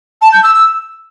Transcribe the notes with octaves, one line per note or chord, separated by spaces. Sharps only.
A5
G6
E6
E6